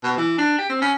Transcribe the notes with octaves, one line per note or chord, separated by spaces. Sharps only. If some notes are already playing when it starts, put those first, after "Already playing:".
B2
E3
D4
G4
C4
C#4